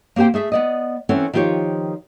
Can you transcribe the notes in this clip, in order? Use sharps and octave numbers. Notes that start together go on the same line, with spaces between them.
A#3 C4 G4 C5 G5
A3 G#4 E5
B3 D5 D#5
E3 C4 C#4 A4 F#5
D#3 F3 F4 G4 C#5